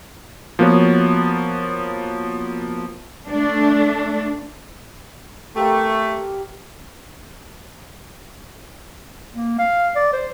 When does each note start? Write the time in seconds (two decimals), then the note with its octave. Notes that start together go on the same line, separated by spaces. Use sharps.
0.59 F3 A#3 B3 F#4 C#5
3.28 A3 D4
5.56 A3 A#3 C4 G4
9.34 A#3
9.59 F5
9.96 D5
10.13 C5